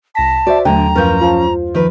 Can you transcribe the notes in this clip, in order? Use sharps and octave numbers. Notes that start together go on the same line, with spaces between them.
C2 A5 A#6 B6
F#4 C5 D5 E5
D#2 D3 F#3 A3 G5 A#5
F#2 F3 C#4 A#4 B4 G6
F4 C5 F5 A5
D#3 F3 B4